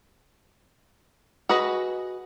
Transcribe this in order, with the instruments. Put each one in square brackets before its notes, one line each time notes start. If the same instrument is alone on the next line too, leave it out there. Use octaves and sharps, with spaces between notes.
[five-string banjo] F#4 G#4 B4 D#5